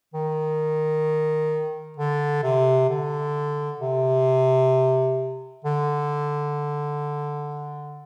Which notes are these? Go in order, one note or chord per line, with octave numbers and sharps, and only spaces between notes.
D#3
D3
C3
D3
C3
D3